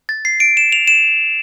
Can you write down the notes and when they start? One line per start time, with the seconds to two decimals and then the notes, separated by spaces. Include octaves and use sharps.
0.09 A6
0.25 C7
0.40 D7
0.57 E7
0.72 F7
0.87 E7